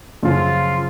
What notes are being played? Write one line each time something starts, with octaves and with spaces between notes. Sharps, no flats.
F#2 C#3 F3 F4